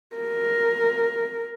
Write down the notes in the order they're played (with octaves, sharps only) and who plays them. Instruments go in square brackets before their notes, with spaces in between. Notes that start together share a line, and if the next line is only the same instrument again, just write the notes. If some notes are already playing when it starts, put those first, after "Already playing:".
[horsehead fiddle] A#4